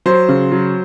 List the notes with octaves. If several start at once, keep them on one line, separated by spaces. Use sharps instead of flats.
F#3 C5
C#3
F#3